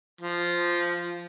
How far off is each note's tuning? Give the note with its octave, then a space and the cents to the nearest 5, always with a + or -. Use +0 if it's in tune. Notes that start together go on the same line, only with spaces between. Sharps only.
F3 -5